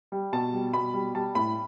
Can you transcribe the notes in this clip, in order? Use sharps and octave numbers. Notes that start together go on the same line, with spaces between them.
G3
B2 A5
G3
B2 B5
G3
G3 A5
A2 B5